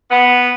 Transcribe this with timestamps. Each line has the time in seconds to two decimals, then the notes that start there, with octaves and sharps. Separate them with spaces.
0.11 B3